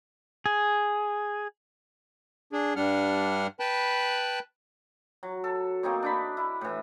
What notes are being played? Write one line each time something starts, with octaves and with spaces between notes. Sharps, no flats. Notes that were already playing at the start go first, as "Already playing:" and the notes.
G#4
D4 G#4
G2 G3 D4 F#5 F6
B4 G5 A5 B5 F#6
F#3
A4
A#3 C4 D#4 C#5
D4 D#4 B5
E4
A2 E3